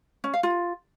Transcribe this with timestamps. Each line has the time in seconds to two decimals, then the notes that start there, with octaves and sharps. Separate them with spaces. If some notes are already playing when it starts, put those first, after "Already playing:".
0.24 C#4
0.34 F5
0.43 F4